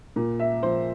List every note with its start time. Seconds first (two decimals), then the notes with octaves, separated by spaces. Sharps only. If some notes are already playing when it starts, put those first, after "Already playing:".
0.16 A#2
0.40 E5
0.63 F3 C5